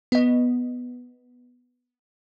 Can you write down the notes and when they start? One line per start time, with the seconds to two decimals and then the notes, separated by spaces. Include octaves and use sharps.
0.12 B3 D#5